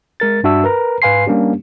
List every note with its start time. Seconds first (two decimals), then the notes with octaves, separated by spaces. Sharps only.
0.20 G#3 A#4 A6
0.44 G2 D4 F#4 E5 A5 E6
0.64 A#4 B4 A#5
1.02 G#2 B4 F5 G#5 C6 C7
1.26 G3 A#3 C#4 D4 G4